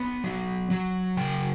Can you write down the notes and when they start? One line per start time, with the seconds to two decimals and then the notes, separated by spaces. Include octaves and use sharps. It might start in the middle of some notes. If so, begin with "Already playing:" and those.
Already playing: B3 C#5
0.24 F#3
0.71 F#3
1.17 C#3 G5